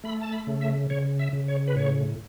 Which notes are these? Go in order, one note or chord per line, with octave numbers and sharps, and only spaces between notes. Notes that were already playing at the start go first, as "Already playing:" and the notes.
A3 B5
A5
B5
C#3
E5
C#3 C#5
E5
C#3
C#5
B4
A2 C#5